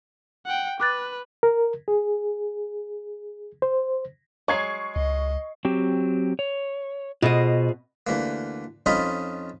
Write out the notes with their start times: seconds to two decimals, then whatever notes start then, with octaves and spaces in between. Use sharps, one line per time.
0.46 F#5 G5
0.80 B4 D6 F#6 A6
1.43 A#4
1.88 G#4
3.62 C5
4.48 F#3 G#3 C#6 G#6 C7
4.96 C#2 D#5
5.65 F#3 C4 G4
6.39 C#5
7.22 B2 F4 G#4 C5 D#5
8.07 D2 E3 A#3
8.86 F2 C#4 D#4 F4 D#5 B5